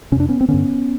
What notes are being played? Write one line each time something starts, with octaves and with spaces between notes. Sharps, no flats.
F2 C3 C#4 D4
B3 C#4
C4
G2 D3 B3 C#4